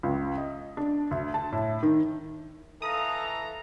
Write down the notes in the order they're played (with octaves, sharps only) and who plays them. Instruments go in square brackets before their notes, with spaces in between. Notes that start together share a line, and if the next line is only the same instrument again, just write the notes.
[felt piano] C#2
D#5
D4
D2
A5
A2
D#3
[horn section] E3 A#5 [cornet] A4 [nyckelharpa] D#5 F5 [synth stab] D#6